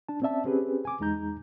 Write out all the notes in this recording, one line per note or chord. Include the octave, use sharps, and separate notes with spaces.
D4 A5
C4 C#4 D5 E5 A5
C4 C#4 G4 G#4 B4
G#5 D6
E2 G#3 D#4 A#5 G6